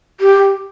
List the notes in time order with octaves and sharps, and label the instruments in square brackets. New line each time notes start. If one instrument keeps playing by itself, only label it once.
[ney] G4